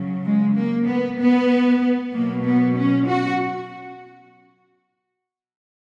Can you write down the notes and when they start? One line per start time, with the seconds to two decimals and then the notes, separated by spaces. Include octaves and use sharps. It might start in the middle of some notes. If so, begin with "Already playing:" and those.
Already playing: C#3 F#3
0.25 G#3
0.55 A#3
0.87 B3
1.18 B3
2.12 B2 F#3 A#3
2.44 B3
2.76 C#4
3.07 F#4